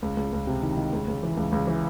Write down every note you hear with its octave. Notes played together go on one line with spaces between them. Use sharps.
C#2
C#2
C#2
C3
D#3
D#3
C#2
C#2
E3
C#2
C#2
E3